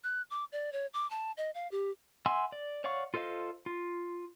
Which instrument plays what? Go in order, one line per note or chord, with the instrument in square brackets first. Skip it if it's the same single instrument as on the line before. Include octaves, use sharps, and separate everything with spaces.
[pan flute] F#6
D6
D5
C#5
D6
A5
D#5
F5
G4
[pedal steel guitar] E5 F#5 G#5 C6 E6
D5
C#5 D5 F5 F#5 C#6
F4 A4 C5 D#5 F5
F4